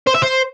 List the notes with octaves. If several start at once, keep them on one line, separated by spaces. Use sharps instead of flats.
C5
E5
C5